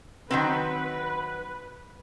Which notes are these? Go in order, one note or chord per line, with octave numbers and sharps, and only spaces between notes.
D#3 F#3 C4 B4